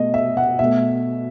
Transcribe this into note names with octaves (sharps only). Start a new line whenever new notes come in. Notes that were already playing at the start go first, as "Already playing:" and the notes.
Already playing: B2 A3 D#5
E5
F#5
B2 A3 E5